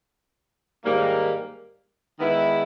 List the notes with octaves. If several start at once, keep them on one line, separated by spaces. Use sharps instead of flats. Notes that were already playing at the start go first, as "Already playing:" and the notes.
G#2 D#3 G3 A#3
D#3 G#3 B3 E4